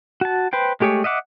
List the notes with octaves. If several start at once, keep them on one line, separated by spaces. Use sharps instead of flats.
F#4 A5
B4 C5 G5
G#3 A3 G4 G#4 C#5
D#5 E5 F#5 D6